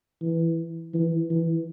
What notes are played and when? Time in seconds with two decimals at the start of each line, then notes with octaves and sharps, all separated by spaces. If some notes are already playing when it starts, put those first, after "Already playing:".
0.21 E3
0.94 E3
1.30 E3